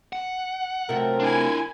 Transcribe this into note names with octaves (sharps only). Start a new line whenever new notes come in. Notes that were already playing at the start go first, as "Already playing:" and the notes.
F#5
C3 F#3 A3 F4 A#4
D4 E4 G#5